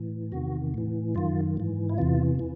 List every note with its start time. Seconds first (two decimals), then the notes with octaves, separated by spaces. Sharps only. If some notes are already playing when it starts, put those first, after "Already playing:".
Already playing: A2 E3
0.32 E2 C3 D#3 F#4
0.74 A2 E3
1.15 F#2 D#3 F4
1.57 G#2 E3
1.89 E4
1.98 E2 C3 E3 F4
2.39 E3